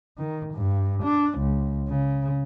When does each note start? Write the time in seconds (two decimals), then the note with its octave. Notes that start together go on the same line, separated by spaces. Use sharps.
0.17 D#3
0.54 G2
1.03 D4
1.39 C#2
1.88 C#3